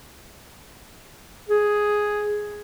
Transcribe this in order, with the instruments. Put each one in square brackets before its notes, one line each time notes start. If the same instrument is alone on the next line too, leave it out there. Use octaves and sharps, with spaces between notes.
[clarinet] G#4